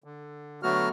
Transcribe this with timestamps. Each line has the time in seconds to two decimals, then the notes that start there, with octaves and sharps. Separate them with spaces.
0.04 D3
0.63 D3 F#3 A3 B3 F#4 F6